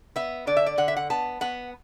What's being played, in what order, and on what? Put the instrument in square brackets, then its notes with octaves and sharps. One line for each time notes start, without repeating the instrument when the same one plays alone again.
[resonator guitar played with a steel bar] B3 E5
D3 D5
E5
D5
D3 F#5
E5
F#5
B3 A5
B3 F#5